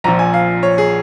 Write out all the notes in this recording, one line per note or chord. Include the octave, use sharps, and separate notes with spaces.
A#1 A#2 F3 A#5
G#5
F5
C#5
G#4